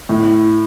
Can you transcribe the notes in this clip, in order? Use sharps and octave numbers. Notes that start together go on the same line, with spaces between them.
A2